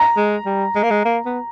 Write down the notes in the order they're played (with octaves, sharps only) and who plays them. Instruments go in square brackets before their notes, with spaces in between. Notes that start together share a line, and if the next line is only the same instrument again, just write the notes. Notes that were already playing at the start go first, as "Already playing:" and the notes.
Already playing: [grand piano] A#5
[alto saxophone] G#3
G3
G#3
A#3
G#3
A#3
B3